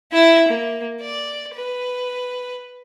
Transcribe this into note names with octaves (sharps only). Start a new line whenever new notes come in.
E4 E5
A#3
D5
B4